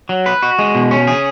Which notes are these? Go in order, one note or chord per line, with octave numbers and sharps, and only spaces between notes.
F#3
B4
F#4
G#3
B2
C#4
G#4